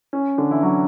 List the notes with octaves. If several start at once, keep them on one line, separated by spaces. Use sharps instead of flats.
C#4
D3 D4
E3 E4
F#3 F#4